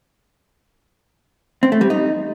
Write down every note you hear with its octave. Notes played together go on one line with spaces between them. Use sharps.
C4
A3
G3
D#4